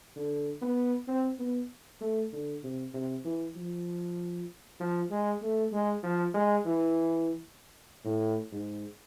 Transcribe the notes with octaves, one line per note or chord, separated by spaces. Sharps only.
D3
B3
C4
B3
A3
D3
C3
C3
E3
F3
F3
G#3
A3
G#3
F3
G#3
E3
A2
G#2